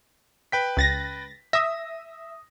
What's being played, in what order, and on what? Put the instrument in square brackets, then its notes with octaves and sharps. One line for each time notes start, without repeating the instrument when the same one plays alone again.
[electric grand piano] B4 G5 B6
[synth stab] C#2 A6 A#6
[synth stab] E5 [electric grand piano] D#6 A#6